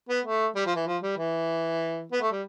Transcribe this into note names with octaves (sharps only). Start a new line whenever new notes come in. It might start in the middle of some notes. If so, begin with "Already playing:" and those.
B3
A3
G3
F3
E3
F3
G3
E3
B3
A3
G3